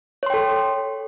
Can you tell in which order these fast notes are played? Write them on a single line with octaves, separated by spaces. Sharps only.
C#5 C6 G5 A4